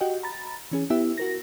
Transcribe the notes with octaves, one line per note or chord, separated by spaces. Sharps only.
F#4 G4 D#5 F#5 G5
A#5 B5 A6
E3 C#4 G#4
B3 E4 G4 E5
F#4 A#4 A#6